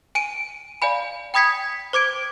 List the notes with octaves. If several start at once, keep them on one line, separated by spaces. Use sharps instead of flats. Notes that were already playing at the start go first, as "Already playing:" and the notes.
G#5 D7 D#7
D5 F5 G#5 B5
G5 B5 D#6 G#6 B6 C#7
C5 D6 G#6 D7